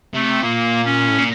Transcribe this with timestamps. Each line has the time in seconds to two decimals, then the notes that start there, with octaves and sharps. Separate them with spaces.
0.14 C3 A3
0.43 A#2 A#3
0.85 C#4
1.08 A2
1.18 A#2